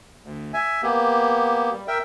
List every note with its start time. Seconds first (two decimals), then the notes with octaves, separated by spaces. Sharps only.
0.24 D2
0.54 E5 G#5
0.83 A#3 B3 G4
1.73 G3
1.88 A#4 E5 G5